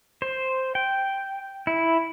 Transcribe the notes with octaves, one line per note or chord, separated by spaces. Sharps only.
C5
G5
E4